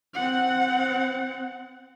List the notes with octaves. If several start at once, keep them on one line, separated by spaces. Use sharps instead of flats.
C4 F#5